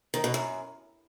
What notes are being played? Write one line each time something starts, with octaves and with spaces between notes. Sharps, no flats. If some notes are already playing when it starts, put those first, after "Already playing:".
D#3
B2
F#2